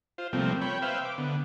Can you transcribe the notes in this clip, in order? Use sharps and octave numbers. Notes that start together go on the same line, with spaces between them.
F4 C5
C3 F3 G3 A3 A#3 C4
C#5 G5 B5
B4 C5 E5 F5 G5
D6
D3 B3